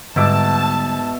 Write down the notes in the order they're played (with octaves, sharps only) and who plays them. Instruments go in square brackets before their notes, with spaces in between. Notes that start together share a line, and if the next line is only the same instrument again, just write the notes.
[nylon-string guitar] G#2 [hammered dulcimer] B2 E5 D6 [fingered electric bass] D3 G3 [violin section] A5